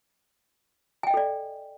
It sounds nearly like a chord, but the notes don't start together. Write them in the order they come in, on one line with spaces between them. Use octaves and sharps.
G#5 G5 D#5 A4 D5